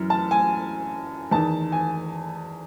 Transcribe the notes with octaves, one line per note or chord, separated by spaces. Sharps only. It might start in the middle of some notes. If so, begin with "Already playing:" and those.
Already playing: F#2 E3
A5
G#5
E2 D#3 A5
G#5